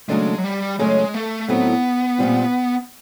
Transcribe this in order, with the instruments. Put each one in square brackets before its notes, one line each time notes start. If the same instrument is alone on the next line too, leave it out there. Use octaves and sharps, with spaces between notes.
[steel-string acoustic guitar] D#2 C#3 F#3 A3 D4 [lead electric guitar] G#3
[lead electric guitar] F#3
G3
[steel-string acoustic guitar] F#2 C#3 F#3 A3 C#4 [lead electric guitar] G#3
[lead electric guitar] A3
[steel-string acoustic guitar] A2 F#3 A3 C4 D#4 [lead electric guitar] B3
[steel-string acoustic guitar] A#2 G3 C4 F4